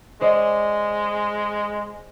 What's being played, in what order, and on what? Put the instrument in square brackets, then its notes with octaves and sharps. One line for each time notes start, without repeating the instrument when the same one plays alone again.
[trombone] G#3 [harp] C5 D5 D#5